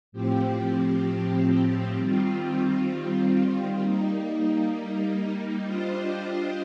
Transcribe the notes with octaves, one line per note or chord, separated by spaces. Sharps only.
A2 F3 C4 G4
D#3 G3 C4 F4
G3 A#3 D#4
G3 D4 F4 C5 D#5